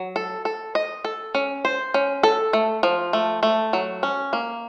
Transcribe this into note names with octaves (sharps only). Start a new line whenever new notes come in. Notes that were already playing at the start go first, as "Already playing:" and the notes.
Already playing: F#3
A4
A4
D#5
A4
C#4
C5
C#4
A4
A3
F3
A3
A3
F#3
C#4
A#3